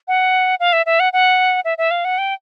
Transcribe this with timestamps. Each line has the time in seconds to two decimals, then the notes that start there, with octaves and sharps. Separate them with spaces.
0.08 F#5
0.60 F5
0.73 E5
0.86 E5
1.00 F#5
1.13 F#5
1.65 E5
1.78 E5
1.91 F5
2.05 F#5
2.18 G5